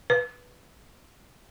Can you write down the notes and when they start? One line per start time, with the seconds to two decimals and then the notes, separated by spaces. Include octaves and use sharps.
0.10 B4